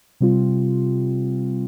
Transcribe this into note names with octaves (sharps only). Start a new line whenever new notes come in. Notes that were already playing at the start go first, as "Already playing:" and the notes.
C3 G3 C4 F4